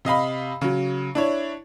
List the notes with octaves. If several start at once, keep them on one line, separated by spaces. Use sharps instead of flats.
C3 D#5 F5 B5
C#3 F#3
D4 E4 C#5